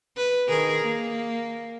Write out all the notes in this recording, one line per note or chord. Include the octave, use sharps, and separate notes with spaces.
B4
D#3 G#4 A#4
A#3